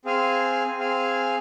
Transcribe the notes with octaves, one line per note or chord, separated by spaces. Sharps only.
C4 G#4 F5 G#5
C4 G#4 F5 G#5